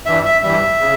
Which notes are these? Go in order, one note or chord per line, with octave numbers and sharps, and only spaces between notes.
G2 E3 G3 E5
E5
G2 E3 G3 E5
C#3